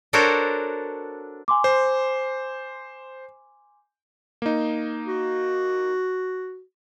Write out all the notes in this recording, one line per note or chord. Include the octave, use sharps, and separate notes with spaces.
D4 F#4 A4 A#4 C5 C#5
G#5 C6 D6
C5
A#3 D#4
F#4